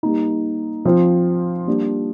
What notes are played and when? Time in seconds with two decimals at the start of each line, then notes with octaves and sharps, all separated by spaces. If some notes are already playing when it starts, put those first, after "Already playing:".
0.03 G3 A#3 D#4
0.85 F3 C4 F4
1.67 G3 A#3 D4 G4